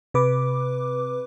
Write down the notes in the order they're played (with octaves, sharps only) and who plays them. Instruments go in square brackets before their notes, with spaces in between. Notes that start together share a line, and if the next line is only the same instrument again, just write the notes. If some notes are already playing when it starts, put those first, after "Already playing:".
[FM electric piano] C3 B4 D6